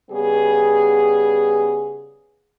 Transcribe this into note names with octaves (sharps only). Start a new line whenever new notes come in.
C#3 G3 B3 G#4